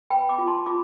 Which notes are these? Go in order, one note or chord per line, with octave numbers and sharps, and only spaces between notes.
B4 G5 B5
B5 D6
F4
A5 C6
F4 B5 D6